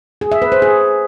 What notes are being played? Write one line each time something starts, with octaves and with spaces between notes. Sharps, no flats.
G#4
E5
B4
C5
G#4